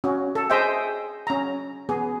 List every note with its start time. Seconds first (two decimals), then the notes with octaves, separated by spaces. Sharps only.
0.04 C#4 F#4
0.35 A4
0.50 G#4 C5 D#5 E5 G5
1.27 C#4 A#5
1.89 B3 G#4